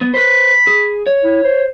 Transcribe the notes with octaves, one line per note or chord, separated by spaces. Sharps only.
B3
B4 C5 B5
G#4
C#5
E4
C5